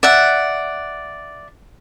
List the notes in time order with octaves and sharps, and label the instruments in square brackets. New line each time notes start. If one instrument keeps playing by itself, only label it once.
[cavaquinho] D5 E5 F#5